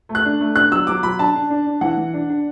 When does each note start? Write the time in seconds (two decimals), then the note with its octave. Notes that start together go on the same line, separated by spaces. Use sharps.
0.09 A3
0.15 F#6
0.25 D4
0.41 A3
0.56 D4 F#6
0.72 F#3 E6
0.87 F#3 D6
1.03 F#3 B5
1.19 D4 A5
1.35 D4
1.50 D4
1.67 D4
1.81 E3 F#5
1.97 E3
2.14 D4
2.29 D4